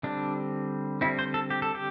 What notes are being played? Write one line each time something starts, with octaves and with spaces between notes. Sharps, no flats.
D3 G3 C4 D4
D3 G3 C4 E4
C5
A4
G4
A4
G4